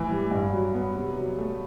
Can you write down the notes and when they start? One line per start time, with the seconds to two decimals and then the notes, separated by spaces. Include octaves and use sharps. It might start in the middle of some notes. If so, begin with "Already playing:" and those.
Already playing: A2 E3
0.11 G3
0.31 G2
0.53 F#3
0.74 B3
0.96 C3
1.17 F#3
1.38 A3